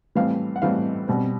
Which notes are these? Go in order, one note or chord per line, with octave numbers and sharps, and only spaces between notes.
A2 E3 G3 C4 F5
F#5
A2 E3 G3 C4 F5
B2 G3 C4